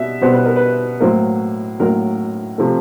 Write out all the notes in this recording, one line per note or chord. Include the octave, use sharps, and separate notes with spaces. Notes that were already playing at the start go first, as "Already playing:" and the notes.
Already playing: B2 G3 E5
B2 G3 B3 C5
B4
A#4
B4
A2 F#3 A#3 C5
A2 F#3 A#3 A#4
C3 F3 A3